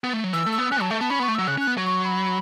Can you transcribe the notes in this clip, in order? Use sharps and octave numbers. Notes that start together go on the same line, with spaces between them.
B3
A3
F#3
E3 E6
A3
E6
B3
C#4 F#6
F#3 A5
A3 E5
B3 A5
C#4 B5
B3 C#6
A3
F#3 E6
C#3 F#6
C#4 F#6
B3
F#3
C#6
B5